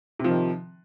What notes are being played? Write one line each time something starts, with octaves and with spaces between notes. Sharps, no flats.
C3 D#3 F3